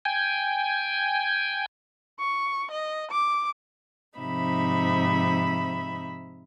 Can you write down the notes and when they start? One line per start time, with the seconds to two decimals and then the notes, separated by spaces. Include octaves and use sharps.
0.05 G5 G#5
2.19 C#6
2.71 D#5
3.11 D6
4.17 G#2 C3 F3 D#4 E5 B5